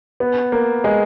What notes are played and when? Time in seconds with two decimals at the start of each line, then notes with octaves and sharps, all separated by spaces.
0.20 B3
0.52 A#3
0.84 G#3